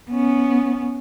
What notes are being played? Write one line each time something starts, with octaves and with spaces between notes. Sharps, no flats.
B3 C#4